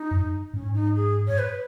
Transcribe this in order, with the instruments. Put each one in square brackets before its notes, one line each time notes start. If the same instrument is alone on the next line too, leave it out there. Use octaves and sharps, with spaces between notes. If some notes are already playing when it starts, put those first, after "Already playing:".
Already playing: [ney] D#4
[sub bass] F#2
[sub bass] G#2 [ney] C#4
[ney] D#4
G#4
C#5
B4